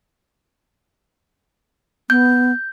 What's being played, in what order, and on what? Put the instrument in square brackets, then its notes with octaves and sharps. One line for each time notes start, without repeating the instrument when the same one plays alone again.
[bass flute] B3 [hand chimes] G6